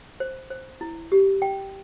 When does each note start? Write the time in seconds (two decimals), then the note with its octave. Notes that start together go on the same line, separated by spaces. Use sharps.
0.20 C5
0.50 C5
0.81 E4
1.12 G4
1.42 G5